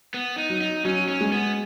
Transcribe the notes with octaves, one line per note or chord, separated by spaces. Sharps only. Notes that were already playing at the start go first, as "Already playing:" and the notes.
B3
D#4
F#3
D#4
F#3 C#4
C#4
G#3
B3